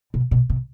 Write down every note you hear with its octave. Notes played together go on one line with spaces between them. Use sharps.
B2
B2
C3